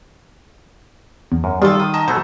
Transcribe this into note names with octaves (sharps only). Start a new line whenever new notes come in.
E2
F#2
D#3 G3 F4 G4 A4
D#3 D#6
D#5 A5 A#5
B2 F#3 A3 C5